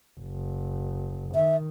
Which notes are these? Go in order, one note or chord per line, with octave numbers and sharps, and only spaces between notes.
F#1
D#3 E5